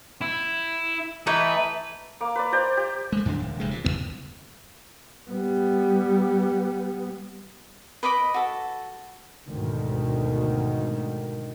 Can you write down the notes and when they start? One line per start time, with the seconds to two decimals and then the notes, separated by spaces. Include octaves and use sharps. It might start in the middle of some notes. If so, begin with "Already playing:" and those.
0.21 E4
1.27 E3 A3 D#4 B4
2.21 A#3 D6
2.35 B4 D5
2.52 C5 D5 G5 A#5
2.77 G4
3.12 G#3 A3
3.25 F2 D3 D#3 D4
3.39 D#1
3.60 F1 D2 G#3
3.71 A#2
3.84 F#1 D2 G2 B3
5.31 G3 B3
8.03 B4 D#5 B5 D6
8.34 F#4 A4
9.48 D2 G#2 B2 D#3